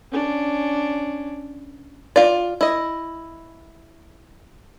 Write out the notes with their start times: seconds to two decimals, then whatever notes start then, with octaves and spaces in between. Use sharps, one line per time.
0.11 C#4 D4
2.16 F4 D5
2.61 E4 D#5